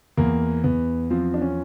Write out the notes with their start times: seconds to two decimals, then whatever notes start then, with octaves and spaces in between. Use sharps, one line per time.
0.17 E2 A#3
0.64 E2 B3
1.10 F3 C4
1.34 D4
1.42 C#4